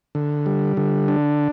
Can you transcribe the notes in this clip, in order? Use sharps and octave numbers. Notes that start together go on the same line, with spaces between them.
D3
G3
D3
D4